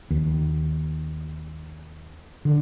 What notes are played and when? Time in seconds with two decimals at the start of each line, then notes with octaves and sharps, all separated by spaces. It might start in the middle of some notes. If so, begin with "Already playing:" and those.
0.11 D#2
2.45 D3